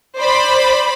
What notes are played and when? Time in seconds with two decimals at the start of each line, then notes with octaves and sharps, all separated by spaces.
0.18 C5 D5 B5